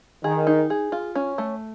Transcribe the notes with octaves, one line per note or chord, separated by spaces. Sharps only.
D#3 G#4
D#4
G#4
F4
C#4
A3